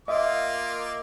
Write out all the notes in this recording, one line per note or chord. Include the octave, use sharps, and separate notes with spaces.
A#3 F4 D#5 E5 D6